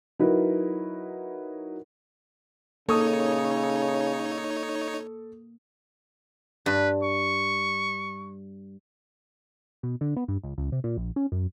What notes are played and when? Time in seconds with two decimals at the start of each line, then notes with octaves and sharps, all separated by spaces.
0.19 F#3 D#4 E4 A#4 B4
2.89 C#3 A#3 D#4 A4 C#5 C#6 D#6
6.66 G2 B4
7.03 C#6
9.83 B2
10.01 D3
10.17 B3
10.28 G2
10.43 C#2
10.58 C#2
10.72 C3
10.84 A#2
10.97 A#1
11.16 C#4
11.32 F#2